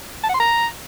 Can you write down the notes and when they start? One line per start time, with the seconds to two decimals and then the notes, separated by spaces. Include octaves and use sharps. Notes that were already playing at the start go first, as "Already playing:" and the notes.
0.24 A5
0.29 F#5
0.35 C6
0.40 A#5